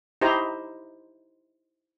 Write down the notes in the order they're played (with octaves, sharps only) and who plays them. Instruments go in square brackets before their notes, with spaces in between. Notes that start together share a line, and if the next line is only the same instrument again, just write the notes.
[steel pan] D#4 E4 G4 C5 A#5